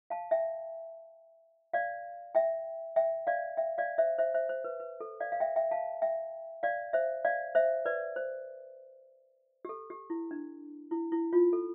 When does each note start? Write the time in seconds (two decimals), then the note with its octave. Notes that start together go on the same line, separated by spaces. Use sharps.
0.10 F5 A5
0.31 E5 G5
1.73 D5 F5
2.35 E5 G5
2.96 E5 G5
3.27 D5 F5
3.57 E5 G5
3.78 D5 F5
3.98 C5 E5
4.18 C5 E5
4.35 C5 E5
4.49 C5
4.64 B4
4.80 B4
5.00 A4
5.20 D5 F5
5.32 F5
5.40 E5 G5
5.56 E5 G5
5.71 F5 A5
6.02 E5 G5
6.63 D5 F5
6.93 C5 E5
7.25 D5 F5
7.55 C5 E5
7.86 B4 D5
8.16 C5
9.65 G4
9.69 A4
9.90 G4
10.10 E4
10.31 D4
10.91 E4
11.12 E4
11.33 F4
11.53 A4